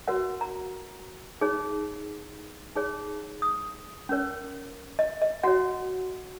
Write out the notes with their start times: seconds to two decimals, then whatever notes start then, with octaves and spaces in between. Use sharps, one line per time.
0.08 F#4 A#4 C#5 F#5
0.41 A#5
1.41 D#4 G#4 C#5
2.76 D#4 G#4 C#5
3.42 D#6
4.09 C#4 A#4 C#5
4.99 D#5
5.22 D#5
5.43 F#4 C#5 F#5